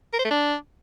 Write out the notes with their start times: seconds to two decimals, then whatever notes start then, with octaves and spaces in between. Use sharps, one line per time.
0.13 A#4
0.19 C5
0.25 A3
0.30 D4